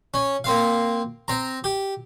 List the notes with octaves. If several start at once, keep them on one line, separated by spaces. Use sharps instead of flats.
C#4
A#3 C4 F5
C4 A#5
G4